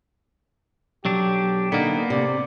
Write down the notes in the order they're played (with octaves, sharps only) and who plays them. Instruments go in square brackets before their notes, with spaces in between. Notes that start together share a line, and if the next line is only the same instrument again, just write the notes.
[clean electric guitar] B1 F#3 D4 [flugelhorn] G4
[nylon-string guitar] D3 [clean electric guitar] A#3 B3 [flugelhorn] D#4
[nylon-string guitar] C3 [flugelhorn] D5